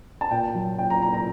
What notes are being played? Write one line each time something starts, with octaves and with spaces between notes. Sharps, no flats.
A5
A#2 G5
F#3
A#2 G5
A#5
A#2 A#5
A#5